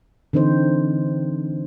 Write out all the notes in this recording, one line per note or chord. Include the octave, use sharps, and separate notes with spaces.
D3 E3 C4 D#4 C5